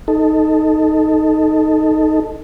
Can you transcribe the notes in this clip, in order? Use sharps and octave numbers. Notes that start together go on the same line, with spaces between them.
D#4 A4